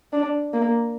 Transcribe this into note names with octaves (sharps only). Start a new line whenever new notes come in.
D4
A#3